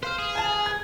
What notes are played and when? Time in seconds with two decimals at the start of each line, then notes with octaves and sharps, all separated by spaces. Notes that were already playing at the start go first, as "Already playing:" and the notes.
0.03 B4 C5 F5 F6
0.18 G#4
0.35 G#5 A5
0.49 G#5
0.66 G#6